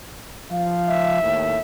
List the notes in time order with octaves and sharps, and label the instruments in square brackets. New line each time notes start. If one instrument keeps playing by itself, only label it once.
[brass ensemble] F3 F5
[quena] E5
[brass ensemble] D#2 A2